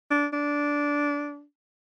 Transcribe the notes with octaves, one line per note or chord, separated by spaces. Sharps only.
D4
D4